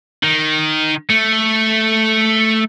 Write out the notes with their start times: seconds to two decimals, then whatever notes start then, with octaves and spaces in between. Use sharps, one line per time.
0.23 D#3
1.10 A3